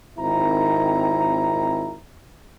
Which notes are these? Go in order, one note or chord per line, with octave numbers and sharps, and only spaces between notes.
G#1 D#3 C4 E4 A#5